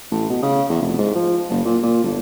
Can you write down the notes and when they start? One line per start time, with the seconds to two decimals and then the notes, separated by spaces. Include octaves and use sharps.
0.11 A1
0.29 B2
0.43 C#3
0.70 E2
0.82 F1
0.98 G#2
1.15 F3
1.50 F#1
1.65 A#2
1.83 A#2
2.04 G1